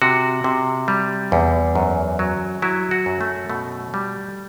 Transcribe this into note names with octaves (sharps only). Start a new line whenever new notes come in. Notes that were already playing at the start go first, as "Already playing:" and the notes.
C3 F#4
C3
G3
E2
F#2
F#3
F#3 E4
F#4
F#2
A3
B2 A3
G3